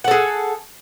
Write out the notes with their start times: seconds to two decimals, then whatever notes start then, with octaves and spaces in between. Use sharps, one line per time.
0.04 F#5
0.08 A4
0.11 G#4